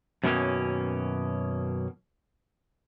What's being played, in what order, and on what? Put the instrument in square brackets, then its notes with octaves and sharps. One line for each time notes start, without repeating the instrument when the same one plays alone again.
[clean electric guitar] F#2 B2 D#3 F#3 A#3 C#4